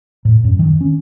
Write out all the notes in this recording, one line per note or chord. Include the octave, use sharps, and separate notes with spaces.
A2
F#2
D#3
C#4